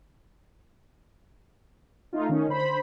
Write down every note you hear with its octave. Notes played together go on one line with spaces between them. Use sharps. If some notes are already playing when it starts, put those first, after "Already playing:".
A3 D#4 F4
D#3 C#4 D#4
D3 C5 B5